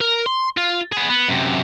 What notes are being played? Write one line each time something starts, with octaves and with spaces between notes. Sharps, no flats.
A#4
C6
F4
B3 G#4
B3
F#2 C3